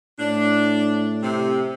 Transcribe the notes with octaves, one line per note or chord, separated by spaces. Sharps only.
A2 D4
C3